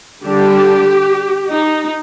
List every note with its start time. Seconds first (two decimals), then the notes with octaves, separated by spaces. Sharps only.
0.24 D3 G3 D4 G4
1.49 D#4